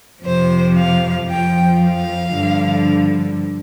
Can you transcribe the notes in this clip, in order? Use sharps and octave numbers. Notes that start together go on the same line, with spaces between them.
F2 C3 F3 C5
F5
F2 F3 G5
F5
G2 D3 F3